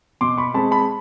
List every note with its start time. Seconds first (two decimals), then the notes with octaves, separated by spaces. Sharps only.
0.21 B2 C6 D6
0.37 B5 C#6
0.54 G#3 C4 A5 B5
0.71 A5 B5